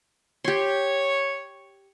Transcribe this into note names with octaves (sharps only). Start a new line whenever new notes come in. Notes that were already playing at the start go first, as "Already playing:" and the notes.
G4 C#5 C6